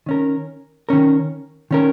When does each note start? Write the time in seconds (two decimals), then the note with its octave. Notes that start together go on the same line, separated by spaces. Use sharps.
0.06 D#3 C#4 A#4
0.89 D#3 C#4 A#4
1.71 D#3 C#4 A#4